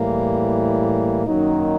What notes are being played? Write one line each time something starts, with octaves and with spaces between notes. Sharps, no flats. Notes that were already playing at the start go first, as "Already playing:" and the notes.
Already playing: A2 E3 G3 A#3
F#2 D#3 F#3 A#3 D#4